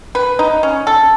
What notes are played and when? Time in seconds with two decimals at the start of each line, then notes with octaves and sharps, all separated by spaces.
0.15 B4
0.39 D#4
0.63 C#4
0.87 A4